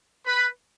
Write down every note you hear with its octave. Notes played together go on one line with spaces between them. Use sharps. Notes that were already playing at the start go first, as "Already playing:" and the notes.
B4 B5